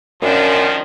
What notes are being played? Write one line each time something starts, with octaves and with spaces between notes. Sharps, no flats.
F#2 D#3 F3 G#3 C#4 D4